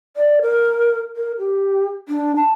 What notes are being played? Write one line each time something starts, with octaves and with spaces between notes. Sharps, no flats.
D5
A#4
A#4
G4
D4
A5